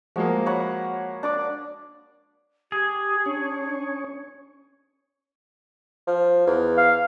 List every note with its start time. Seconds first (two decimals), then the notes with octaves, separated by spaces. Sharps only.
0.16 F3 G#3 A#3 F#4
0.46 C#5 F#5 B5
1.23 D4 D5 D6
2.72 G4 G#4
3.26 C#4 D4 C#5
6.07 F3
6.47 E2
6.77 F5